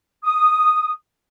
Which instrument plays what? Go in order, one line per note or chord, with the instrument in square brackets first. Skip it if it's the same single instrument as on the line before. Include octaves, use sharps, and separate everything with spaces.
[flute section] D#6